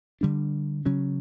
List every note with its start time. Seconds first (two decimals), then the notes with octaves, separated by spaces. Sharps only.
0.21 D3 G3 D4
0.86 C#3 F#3 C#4